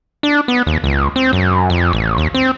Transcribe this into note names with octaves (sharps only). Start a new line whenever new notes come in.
D4
B3
D#2
C#2
C4
F#2
F2
A1
D#2
C4